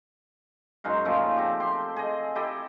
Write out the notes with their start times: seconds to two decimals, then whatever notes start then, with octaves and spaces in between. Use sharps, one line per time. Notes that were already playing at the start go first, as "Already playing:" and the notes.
0.84 F#2 G#3 D#4 F5
1.05 A#2 C#3 F3 A3
1.36 C4 G4
1.60 G4 C6
1.96 G#4 D#5
2.35 E4 G4 A4 D#5